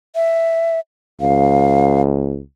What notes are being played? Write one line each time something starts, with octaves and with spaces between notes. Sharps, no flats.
E5
C#2 F5